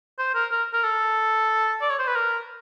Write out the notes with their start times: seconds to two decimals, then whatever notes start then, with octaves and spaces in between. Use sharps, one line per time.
0.18 C5
0.35 A#4
0.51 A#4
0.73 A#4
0.84 A4
1.81 D5
1.90 C#5
1.99 C5
2.07 B4
2.16 A#4